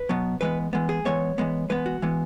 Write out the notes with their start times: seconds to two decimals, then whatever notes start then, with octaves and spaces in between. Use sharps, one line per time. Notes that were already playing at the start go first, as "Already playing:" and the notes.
Already playing: B4
0.09 B2 F#3 B3
0.41 E3 G#3 B3 B4
0.73 E3 G#3 B3
0.89 G#4
1.05 E3 G#3 B3 C#5
1.38 E3 G#3 B3
1.69 E3 G#3 B3 B4
1.86 F#4
2.02 E3 G#3 B3